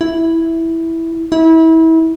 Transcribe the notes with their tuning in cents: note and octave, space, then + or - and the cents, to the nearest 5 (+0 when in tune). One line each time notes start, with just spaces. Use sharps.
E4 -5
E4 -30